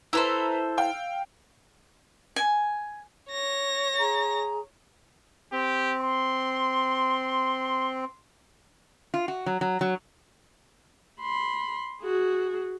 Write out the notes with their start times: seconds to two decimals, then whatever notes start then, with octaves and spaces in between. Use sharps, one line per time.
0.13 E4 A4 B4 C5 A#5 E6
0.78 F5 G5
2.36 G#5
3.30 C#5 A#6
3.98 G#4 A#5
5.53 C4 G4
6.01 C6
9.14 F4
9.28 F#4
9.46 F#3
9.61 F#3
9.81 F#3
11.21 B5 C6
12.02 F#4 G#4